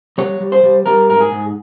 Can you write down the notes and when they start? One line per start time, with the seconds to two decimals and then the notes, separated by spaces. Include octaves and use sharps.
0.18 G3 C#5
0.40 G3
0.52 C5
0.63 G3
0.86 G3 A#4
1.10 G#2 A#4
1.20 G#4
1.32 G#2